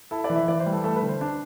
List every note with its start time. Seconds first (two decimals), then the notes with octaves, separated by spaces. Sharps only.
0.11 E4 A4
0.24 D5
0.30 E3
0.36 E5
0.48 E3 D5
0.60 C5
0.66 G3
0.72 A4
0.84 A3 A4
0.96 B4
1.02 D3
1.09 C5
1.21 D4